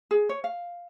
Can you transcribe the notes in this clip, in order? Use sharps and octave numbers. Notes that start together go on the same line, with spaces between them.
G#4
C#5
F5